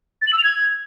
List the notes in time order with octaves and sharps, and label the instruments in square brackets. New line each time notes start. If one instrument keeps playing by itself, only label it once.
[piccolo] A6
F#7
E6
F7
G#6